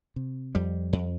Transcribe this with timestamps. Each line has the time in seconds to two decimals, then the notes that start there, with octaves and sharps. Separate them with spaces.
0.16 C3
0.55 F2 G3
0.93 F2